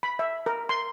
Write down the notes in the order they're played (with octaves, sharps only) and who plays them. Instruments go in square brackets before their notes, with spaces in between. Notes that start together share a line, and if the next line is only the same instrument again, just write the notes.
[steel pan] B5
E5
A#4
C6